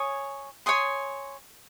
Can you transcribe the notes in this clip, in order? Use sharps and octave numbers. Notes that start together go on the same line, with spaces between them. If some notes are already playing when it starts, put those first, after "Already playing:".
Already playing: C#5 G#5 D#6
C#5 G#5 C6 D#6